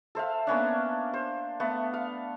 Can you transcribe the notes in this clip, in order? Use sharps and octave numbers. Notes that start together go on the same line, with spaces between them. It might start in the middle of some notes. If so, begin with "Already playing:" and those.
A4 C5 E5 F5
A#3 B3 C#4 D4
C5
A3 B3
F5